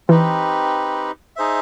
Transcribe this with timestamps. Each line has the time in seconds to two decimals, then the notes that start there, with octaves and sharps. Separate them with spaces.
0.08 E3 C4 D#4 G4 B4
1.36 D#4 G#4 C5 E5